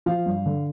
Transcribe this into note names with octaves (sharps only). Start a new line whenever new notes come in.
F3 F5
G2
D3